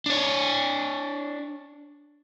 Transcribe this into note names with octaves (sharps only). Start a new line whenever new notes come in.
D4 C#5